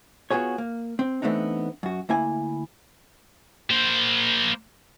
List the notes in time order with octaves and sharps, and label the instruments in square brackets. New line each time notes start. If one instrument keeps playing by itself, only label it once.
[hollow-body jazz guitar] B3 F4 F#4 G#4 C#5
A#3
C4
E3 A3 B3 C4 D4 D#4
F#2 F#4
D2 A#3 E4 G#5
[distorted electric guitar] A#3 C5